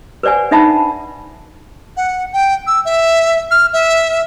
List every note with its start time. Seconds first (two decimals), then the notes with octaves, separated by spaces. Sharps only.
0.23 B4 C5 D5 F#5 G#5
0.51 D4 D#4 E5 F#5 A5 B5
1.97 F#5
2.33 G5
2.67 E6
2.85 E5
3.51 F6
3.73 E5